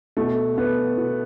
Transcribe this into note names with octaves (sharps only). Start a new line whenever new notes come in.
B2 A3
B3
B2